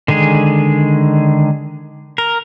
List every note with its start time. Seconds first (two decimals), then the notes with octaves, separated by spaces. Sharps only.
0.08 D3 D#3 G#3 G#4
2.18 A#4